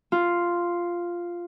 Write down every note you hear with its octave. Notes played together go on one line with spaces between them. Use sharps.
F4